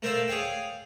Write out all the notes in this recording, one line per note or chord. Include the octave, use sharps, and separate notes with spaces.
A3 A#4 C5 D5 E5 F5
G#4 C#5 F5 G5